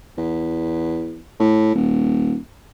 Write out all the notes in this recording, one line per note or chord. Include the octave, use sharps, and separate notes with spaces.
E2
A2
D#1